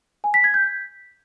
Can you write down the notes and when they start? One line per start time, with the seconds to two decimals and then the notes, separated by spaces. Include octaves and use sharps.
0.24 G#5
0.34 B6
0.44 G#6
0.54 G6
0.64 B6